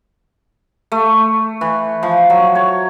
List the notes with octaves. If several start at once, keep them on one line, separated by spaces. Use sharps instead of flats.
A3
E3
F3
F#3
C#5